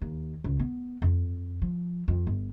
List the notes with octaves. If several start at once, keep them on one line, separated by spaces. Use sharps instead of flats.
D#2
C#2
B3
F2
F3
F2
G1